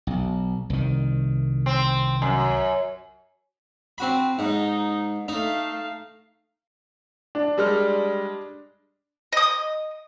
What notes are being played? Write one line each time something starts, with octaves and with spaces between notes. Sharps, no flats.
B1
C2 D#3
C4
F#2
C4 F#4 B5
G#2 D#4
A3 D#4 F5
D4
G3 G#3 F6
D#5 D#6